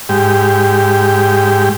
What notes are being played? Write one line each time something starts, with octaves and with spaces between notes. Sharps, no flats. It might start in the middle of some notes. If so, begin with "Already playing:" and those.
G#2 G4